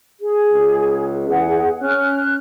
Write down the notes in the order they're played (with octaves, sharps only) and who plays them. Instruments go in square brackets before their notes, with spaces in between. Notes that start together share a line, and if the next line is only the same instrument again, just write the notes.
[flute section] G#4
[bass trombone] C#2
[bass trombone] E2 [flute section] G#4 F#5
[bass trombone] C#4 [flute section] F6 F#6